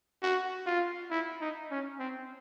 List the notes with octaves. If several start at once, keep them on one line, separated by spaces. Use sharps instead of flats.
F#4
F4
E4
D#4
C#4
C4